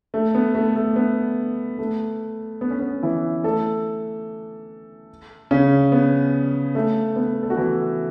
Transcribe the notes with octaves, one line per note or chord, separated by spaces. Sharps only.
A3
B3
A3
A3
B3
A3
B3
C#4
B3
E3 E4
A3 A4
C#3 C#4
B3
A3
B3
A4
F#4
E3 E4